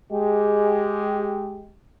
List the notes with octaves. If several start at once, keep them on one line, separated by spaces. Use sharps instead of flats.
G#3 G4